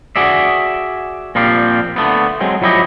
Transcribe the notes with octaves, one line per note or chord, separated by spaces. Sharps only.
F#4 G#4 D5 E5
A#2 F3 G3 C4 F4 G4
D3 A3 B3
F#3 G#3 C4
F3 F#3 E4 G4 D#5